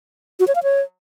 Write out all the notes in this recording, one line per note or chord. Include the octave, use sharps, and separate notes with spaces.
F#4
C#5
F5
C#5